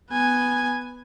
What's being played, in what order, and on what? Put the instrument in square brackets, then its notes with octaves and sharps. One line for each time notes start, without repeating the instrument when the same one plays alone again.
[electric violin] B3 G#5